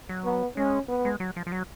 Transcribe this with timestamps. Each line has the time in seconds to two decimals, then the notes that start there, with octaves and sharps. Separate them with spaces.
0.09 F#3
0.24 B3
0.56 G#3 C#4
0.88 B3
1.05 G#3
1.20 F#3
1.36 F3
1.47 F3
1.52 F#3